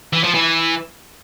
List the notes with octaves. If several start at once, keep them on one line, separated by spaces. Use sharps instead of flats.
E3
F3
E3